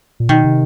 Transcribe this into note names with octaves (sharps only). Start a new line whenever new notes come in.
A#2
B2 D#3
C3